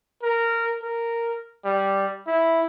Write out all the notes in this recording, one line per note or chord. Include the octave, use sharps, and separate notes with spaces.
A#4
A#4
G3
E4